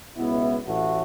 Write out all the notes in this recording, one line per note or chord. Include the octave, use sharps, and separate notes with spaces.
C#2 B2 B3 E4
A1 A2 E3 A3 F#4